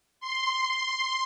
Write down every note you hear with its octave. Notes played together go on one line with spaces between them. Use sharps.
C6